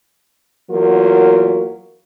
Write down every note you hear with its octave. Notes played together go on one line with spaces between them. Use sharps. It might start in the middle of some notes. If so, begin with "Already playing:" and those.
E2 F#3 A#3 F4 A#4